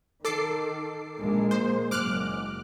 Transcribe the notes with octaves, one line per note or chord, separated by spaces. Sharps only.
D#3 A4 D6 C7
A#1 G#3 A#3
C5
F#1 G#3 D6 F6 F#6